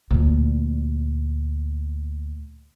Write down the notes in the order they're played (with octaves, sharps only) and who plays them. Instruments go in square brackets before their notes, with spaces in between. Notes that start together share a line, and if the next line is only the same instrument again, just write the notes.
[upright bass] D2 A#2